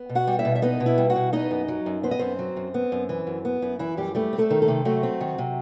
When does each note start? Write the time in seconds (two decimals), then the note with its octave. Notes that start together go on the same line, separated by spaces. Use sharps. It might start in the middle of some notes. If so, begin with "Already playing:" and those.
Already playing: B3
0.09 B2
0.15 F#4 F#5
0.27 G3
0.39 E4 E5
0.45 B2
0.55 E5
0.62 B3 D#4 D#5
0.80 B2
0.86 E4 E5
0.98 G3
1.10 F#4 F#5
1.16 B2
1.33 B3 D#4 D#5
1.51 F#2
1.68 F#3
1.86 F#2
2.03 B3 C5
2.11 D#5
2.19 F#2 C4 C5
2.39 F#3
2.57 F#2
2.74 B3
2.92 F#2
3.09 E3
3.27 F#2
3.45 B3
3.62 F#2 E4
3.79 E3 E4
3.97 F#2 G3 G4
4.15 G3 A3 G4
4.33 C4
4.38 A3 A4
4.50 D#3
4.62 A3 A4
4.68 C3
4.85 F#3 A3 F#4
5.03 C4
5.21 D#3
5.38 C3